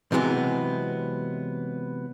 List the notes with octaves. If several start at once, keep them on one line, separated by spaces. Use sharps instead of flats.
C3 E3 F#3 G#3 B3